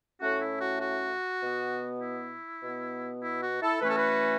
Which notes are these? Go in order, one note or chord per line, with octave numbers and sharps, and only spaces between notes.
A2 A3 C#4 F#4
E4
F#4
F#4
B2 B3
E4
B2 B3
E4
F#4
E4 A4
E3 A3 C#4 B4
A4
F#4 B4